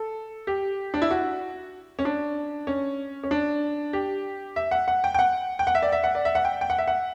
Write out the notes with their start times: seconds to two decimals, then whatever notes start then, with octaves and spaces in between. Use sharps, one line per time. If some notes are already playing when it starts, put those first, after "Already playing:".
Already playing: A4
0.47 G4
0.94 D4
1.02 E4
1.11 F#4
1.99 C#4
2.05 D4
2.67 C#4
3.23 C#4
3.31 D4
3.93 G4
4.56 E5
4.71 F#5
4.88 F#5
5.04 G5
5.14 G5
5.19 F#5
5.59 G5
5.67 F#5
5.75 E5
5.83 D5
5.92 E5
6.04 F#5
6.15 D5
6.25 E5
6.35 F#5
6.45 G5
6.61 G5
6.70 F#5
6.78 E5
6.87 F#5